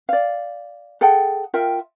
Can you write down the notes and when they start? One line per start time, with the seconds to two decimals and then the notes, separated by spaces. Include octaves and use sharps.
0.09 D5 F5
1.01 G#4 A4 F#5 G5
1.54 F4 A#4 E5 G5